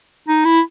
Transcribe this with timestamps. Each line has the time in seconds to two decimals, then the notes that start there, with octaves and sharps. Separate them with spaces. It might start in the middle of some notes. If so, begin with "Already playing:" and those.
0.28 D#4
0.45 E4